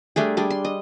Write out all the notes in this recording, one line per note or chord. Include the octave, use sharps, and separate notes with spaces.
G3 A3 D4 G#4
G3 D4 G#4
C6
D#5